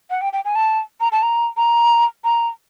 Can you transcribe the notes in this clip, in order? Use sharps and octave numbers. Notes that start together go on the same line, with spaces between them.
F#5
G5
G5
G#5
A5
A#5
A5
A#5
A#5
A#5